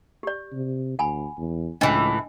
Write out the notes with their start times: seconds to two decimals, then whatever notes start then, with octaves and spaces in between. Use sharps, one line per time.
0.23 G4 D5
0.53 C3
0.99 D2 F#5 G#5 B5
1.38 E2
1.81 C#2 A2 E3 D4 D#5 G#5